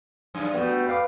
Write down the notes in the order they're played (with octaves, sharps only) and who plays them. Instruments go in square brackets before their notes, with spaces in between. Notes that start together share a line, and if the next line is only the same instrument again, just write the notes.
[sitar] F#2
[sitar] G3 A3 [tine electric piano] B3 F#4
[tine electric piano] B4 F5 D6